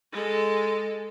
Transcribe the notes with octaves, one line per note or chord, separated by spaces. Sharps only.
G#3 A4